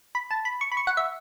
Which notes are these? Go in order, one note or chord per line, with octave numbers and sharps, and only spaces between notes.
B5
A5
B5
C#6
B5
C#6
F#5
E5